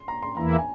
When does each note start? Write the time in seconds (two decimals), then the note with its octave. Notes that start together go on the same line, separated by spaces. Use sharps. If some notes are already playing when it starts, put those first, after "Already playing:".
Already playing: C6
0.08 A#5
0.23 C6
0.37 E2 E3 A#3 E4 A#5
0.58 G#5